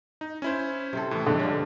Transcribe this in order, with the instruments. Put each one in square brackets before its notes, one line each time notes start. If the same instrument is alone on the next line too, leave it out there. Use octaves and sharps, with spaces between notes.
[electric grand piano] D#4
C#4 E4 C5
[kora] C3 C4 A4
[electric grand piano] A2 E3
[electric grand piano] F2 [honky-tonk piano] D3 [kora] G#3
[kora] G2 C#4